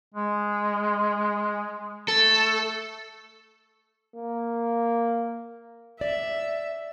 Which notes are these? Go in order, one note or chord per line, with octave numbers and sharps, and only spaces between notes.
G#3
A3 A4
A#3
D5 E5